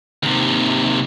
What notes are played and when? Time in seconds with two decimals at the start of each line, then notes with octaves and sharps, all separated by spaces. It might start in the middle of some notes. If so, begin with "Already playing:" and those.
0.23 D#2 C3